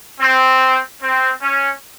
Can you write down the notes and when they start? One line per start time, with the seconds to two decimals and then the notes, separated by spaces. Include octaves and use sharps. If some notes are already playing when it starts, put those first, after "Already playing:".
0.20 C4
1.01 C4
1.42 C#4